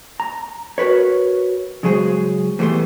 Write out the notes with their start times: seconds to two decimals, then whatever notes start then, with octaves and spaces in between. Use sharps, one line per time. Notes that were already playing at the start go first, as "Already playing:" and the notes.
0.20 A#5
0.78 F#4 A#4 B4 C#5
1.83 C#3 F#3 G#3 G#4 B4 C5
2.59 A2 E3 G3 A3 B3 C6